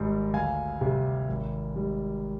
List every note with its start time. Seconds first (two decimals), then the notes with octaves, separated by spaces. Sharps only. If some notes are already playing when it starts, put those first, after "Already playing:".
Already playing: G#1 G#2 G3
0.33 D2 F5 G#5
0.81 C3 G3
1.28 G#1
1.76 G#2 G3